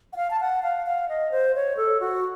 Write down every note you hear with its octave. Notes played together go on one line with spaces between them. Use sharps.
F#5
F5
A5
F#5
F5
F5
D#5
C5
C#5
A4
F#4